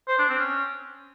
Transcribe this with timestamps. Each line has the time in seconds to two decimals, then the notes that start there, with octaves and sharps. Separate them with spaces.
0.08 C5
0.18 D4
0.29 C4
0.39 C#4